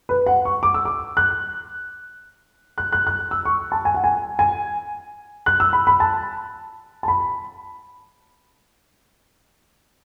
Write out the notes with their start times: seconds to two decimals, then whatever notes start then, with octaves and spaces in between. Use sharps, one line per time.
0.09 B4
0.26 F#5
0.45 C#6
0.63 D6
0.74 E6
0.85 D6
1.17 F#6
2.78 F#6
2.92 F#6
3.07 F#6
3.31 E6
3.45 C#6
3.72 A5
3.85 G#5
3.95 F#5
4.04 G#5
4.39 G#5
5.46 F#6
5.60 E6
5.73 B5
5.87 B5
6.00 A5
7.03 A5
7.08 B5